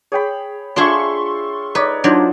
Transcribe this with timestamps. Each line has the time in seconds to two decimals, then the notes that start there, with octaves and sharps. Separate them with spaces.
0.12 G#4 C#5 G5 B5
0.76 D4 F4 G#4 E5 C6 C#6
1.75 D#4 B4 C#5 D5
2.04 F#3 D4 D#4 F4 C5 D5